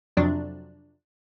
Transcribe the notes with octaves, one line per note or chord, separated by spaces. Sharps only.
F2 C3 F3 F#3 D4